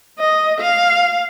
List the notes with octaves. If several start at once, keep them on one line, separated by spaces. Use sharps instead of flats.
D#5
F5